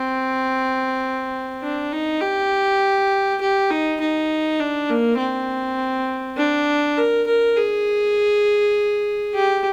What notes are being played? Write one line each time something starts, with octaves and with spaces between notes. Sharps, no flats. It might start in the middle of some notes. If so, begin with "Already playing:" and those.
Already playing: C4
D4
D#4
G4
G4
D#4
D#4
D4
A#3
C4
D4
A#4
A#4
G#4
G4